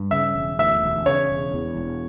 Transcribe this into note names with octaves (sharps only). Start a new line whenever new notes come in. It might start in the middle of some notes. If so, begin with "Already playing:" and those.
Already playing: G2
C#3 E5
E1
D2 E5
E1
C#3 C#5
E1
E2
E1